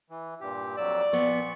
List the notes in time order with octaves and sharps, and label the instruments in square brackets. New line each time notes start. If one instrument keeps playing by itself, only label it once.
[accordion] E3
G2 A#2 G4
[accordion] F2 F#3 E6 [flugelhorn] D5
[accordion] A#2 C#6 [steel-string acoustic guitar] F3 B3